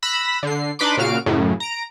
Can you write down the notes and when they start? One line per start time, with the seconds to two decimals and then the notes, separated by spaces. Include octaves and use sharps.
0.02 B5 E6 F#6 A#6
0.43 D3 C7
0.79 D4 D#4 B4 B5 C6 D6
0.97 A#2 C#3 F#4 F5 F6 D7
1.26 F#2 A2 C#3
1.60 A#5 D7